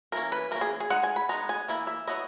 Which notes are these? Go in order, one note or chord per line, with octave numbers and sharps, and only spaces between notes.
E3 A#3 C#4 A#4
B4
E3 A#3 C#4 A#4
G#4
G#4
G#3 D#4 F#5
G#5
B5
G#3 B3 D#4 A#5
G#5
E3 A#3 E4
E5
F#3 B3 E4 D#5